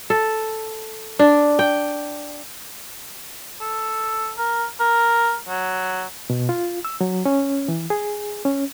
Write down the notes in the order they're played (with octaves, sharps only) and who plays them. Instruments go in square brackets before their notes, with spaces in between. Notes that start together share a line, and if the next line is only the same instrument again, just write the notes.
[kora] A4
D4
G5
[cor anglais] A4
A#4
A#4
F#3
[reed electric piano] B2
F4
E6
F#3
C#4
E3
G#4
C#4